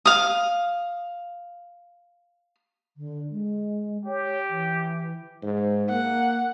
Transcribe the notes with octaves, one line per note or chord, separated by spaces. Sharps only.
F5 D#6
D3
G#3
G4 C#5
E3
G#2
A#3 F#5